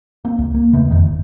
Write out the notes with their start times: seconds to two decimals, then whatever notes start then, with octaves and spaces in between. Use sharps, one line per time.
0.25 A#3 C4
0.39 C#2
0.54 A#3
0.72 E1 C#3 A3 B3
0.91 F1 F2 D#3
1.05 G1